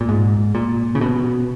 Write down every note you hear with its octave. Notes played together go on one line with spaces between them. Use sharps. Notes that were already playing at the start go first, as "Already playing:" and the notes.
A#2
G#2
A#2
C#3
B2